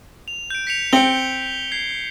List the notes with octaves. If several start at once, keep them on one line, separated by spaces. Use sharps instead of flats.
F7
G6 D7
B6 C#7 F7
C4 C#7 G7
G#6 C7